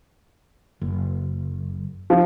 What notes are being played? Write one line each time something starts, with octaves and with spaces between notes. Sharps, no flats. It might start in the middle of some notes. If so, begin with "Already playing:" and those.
F#1
F3